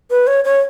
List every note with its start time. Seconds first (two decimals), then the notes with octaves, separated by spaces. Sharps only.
0.10 B4
0.27 C#5
0.44 C#5